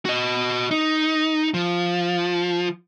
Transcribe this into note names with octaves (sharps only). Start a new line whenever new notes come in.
F#4 D#5
D#4
F3